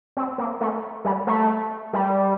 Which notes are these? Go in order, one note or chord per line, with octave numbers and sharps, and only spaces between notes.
C4
A#3
A3
G3
A3
G3